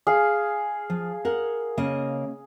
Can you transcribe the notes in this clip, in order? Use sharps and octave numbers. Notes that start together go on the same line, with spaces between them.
G#4 F5
F3
A#4 F#5
C#3 A#3 D#5